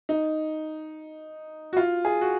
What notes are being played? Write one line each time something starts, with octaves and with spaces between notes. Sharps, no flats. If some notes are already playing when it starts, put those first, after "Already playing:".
D#4
F#4
F4
G#4
F#4